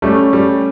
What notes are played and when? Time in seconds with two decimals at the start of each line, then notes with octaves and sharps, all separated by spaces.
0.02 G3 A3 C#4
0.33 G3